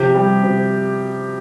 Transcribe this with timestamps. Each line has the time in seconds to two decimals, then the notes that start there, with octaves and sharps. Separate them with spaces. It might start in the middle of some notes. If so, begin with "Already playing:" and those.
Already playing: C3 F3 G4
0.14 G3
0.43 C3